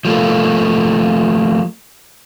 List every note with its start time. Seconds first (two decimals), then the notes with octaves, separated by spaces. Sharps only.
0.05 F3 A3 A#3